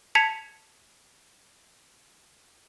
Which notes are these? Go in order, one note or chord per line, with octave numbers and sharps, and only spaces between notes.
A5 G#6 B6 C#7 F7